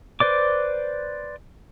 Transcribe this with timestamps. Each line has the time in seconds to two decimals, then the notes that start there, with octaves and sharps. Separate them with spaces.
0.20 B4 C5 D5 D6